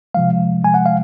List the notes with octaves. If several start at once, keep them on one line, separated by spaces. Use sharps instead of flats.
C3 F3 G#3 F5
C3 F3 G#3 G#5
F#5
F5